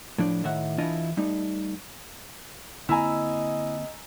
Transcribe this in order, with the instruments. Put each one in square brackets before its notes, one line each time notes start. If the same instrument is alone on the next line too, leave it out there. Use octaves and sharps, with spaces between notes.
[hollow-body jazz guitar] A2 F3 D4
A2 D#3 E5 F#5
E3 D4 E4 F4 D#5
G3 A3 D#4
[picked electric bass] D3 A#3 C4 [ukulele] E4 [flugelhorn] D#5 [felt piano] G#5 A#5 E6